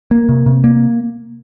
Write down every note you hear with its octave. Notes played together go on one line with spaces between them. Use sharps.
A#3
C3
C3
A#3